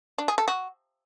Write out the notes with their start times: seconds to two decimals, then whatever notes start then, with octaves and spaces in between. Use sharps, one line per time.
0.18 D4
0.28 G#4
0.38 A4
0.48 F#4